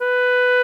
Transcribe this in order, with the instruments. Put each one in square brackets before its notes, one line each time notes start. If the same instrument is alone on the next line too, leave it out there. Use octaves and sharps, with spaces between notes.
[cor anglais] B4